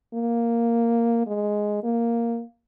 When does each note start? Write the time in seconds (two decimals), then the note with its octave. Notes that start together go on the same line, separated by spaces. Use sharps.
0.14 A#3
1.27 G#3
1.83 A#3